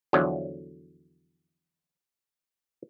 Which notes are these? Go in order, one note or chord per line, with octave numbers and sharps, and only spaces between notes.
E2 D3 F3 F#3